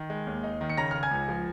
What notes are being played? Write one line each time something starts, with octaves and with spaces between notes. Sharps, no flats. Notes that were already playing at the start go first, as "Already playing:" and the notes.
Already playing: D#3
G#3
D#2
D#4
D#3
C#7
C#3 A#5 A#6
C#3 F6
G#5 G#6
C#2
F3